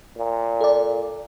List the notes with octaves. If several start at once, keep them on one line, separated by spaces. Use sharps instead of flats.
A#2
A4 D5